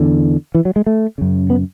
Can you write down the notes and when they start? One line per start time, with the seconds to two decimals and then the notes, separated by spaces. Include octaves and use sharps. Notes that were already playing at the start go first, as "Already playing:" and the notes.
Already playing: E2 D3
0.55 E3
0.65 F#3
0.76 G#3
0.87 A3
1.18 F#2 C#3
1.50 B3